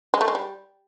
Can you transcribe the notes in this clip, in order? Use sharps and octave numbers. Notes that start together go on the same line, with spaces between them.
G#3
A3
G#3
G3